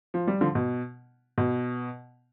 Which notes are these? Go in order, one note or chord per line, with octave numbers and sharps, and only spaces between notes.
F3
G3
D3 F3
B2
B2